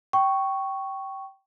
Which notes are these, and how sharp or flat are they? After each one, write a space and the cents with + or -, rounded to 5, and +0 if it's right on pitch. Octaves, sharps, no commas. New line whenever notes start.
G5 -15 C#6 +0